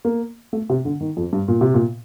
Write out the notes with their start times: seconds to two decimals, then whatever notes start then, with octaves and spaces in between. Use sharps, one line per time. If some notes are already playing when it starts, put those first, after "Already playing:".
0.05 A#3
0.53 A3
0.69 C3
0.85 D3
1.01 D#3
1.17 F2
1.33 G2
1.48 A#2
1.61 C3
1.74 A#2